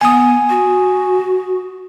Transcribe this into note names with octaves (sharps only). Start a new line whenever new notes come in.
B3 G#5 D#6
F#4